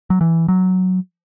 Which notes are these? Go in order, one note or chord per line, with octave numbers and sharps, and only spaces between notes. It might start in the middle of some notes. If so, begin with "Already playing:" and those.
F#3
E3
F#3